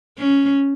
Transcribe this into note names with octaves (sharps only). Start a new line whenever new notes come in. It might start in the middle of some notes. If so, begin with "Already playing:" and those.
C#4